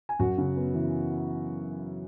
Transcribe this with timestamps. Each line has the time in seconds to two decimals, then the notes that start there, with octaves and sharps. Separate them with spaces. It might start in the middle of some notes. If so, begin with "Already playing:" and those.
0.09 G#5
0.19 F#2 F#4 F#5
0.38 C#3
0.56 B3
0.74 E3